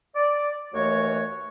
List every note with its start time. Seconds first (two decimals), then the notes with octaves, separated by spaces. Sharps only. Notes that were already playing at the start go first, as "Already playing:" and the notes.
0.15 D5
0.73 D#2 E3 A3 F#4 C#5